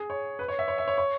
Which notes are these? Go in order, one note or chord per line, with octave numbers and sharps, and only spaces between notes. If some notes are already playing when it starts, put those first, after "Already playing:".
Already playing: G#4
C#5
B4
C#5
E5
C#5
E5
C#5
C#5